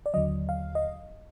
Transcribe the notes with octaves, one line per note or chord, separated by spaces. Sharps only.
D5
D#2 D3 F#3 D#5
F5
D#5